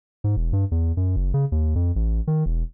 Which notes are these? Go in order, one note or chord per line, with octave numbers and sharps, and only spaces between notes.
G#2
E1
G2
E2
F#2
F#1
C#3
D#2
F2
A1
D#3
E1